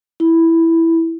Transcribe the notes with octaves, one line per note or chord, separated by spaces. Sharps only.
E4